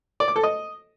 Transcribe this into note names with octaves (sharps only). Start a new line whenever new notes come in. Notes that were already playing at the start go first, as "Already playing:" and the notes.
D5
D6
A4
D#5